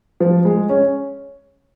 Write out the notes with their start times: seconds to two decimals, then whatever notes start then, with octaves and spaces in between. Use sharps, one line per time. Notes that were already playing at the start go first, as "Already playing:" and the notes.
0.20 F3
0.45 G#3
0.69 C#4